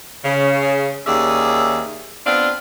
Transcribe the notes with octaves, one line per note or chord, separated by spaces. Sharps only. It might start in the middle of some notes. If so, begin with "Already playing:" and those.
C#3
D#2 C#4 G#4 D5 E5
B3 C4 D4 F4